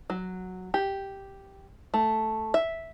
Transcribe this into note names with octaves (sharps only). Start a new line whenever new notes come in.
F#3
G4
A3
E5